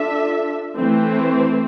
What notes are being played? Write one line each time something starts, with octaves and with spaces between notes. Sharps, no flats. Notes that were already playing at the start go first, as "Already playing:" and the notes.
Already playing: D4 F4 A4 E5
E3 A3 C4